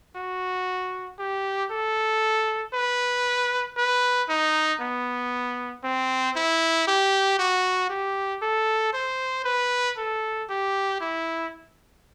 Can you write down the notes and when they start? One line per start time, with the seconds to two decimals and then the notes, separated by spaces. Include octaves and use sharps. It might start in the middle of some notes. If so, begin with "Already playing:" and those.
0.16 F#4
1.19 G4
1.71 A4
2.74 B4
3.77 B4
4.29 D#4
4.80 B3
5.84 C4
6.36 E4
6.87 G4
7.39 F#4
7.90 G4
8.42 A4
8.93 C5
9.45 B4
9.98 A4
10.49 G4
11.01 E4